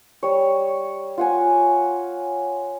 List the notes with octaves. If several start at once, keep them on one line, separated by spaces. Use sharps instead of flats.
G3 C#5
F4 F#5 G#5